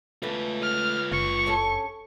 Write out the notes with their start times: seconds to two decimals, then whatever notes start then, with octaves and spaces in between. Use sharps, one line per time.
0.23 E2 A3 F4 B4
0.62 F6
1.12 F#1 C#6
1.46 G2 C#4 A4